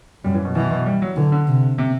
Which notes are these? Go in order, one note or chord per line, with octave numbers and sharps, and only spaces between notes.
F#2 G3
E3
B2
B2 E3
B2
G3
F#3
D3 E3
D3
C3
C3